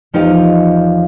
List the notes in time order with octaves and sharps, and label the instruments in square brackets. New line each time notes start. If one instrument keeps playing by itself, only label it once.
[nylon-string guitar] E2 F3 D#4 G4 D#5